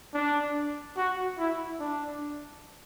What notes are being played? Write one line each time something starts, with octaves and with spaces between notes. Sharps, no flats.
D4
F#4
E4
D4